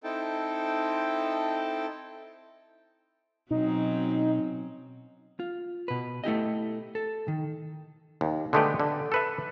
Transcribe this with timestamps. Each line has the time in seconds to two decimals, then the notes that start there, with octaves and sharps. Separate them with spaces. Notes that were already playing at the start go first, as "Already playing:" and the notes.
0.04 C4 D#4 E4 A4 G5 A5
3.51 B2 F#3 C4 C#4 D#4
5.40 F4
5.88 B2 B4
6.24 A3 E4 G4 D#5
6.95 A4
7.28 D#3
8.21 D#2
8.53 D3 G#3 A3 B3 G4 B4
8.80 D3
9.12 A4 B4 E5